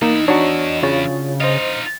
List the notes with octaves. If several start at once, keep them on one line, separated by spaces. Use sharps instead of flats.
E2 A#3 D#4 E4
D4 D#4 F#4 C#5
C#3 F4 C#5 A6
D#4 F4 C5 D#5